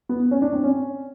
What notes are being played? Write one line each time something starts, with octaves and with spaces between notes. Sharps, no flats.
B3
C#4
D4
C4
C#4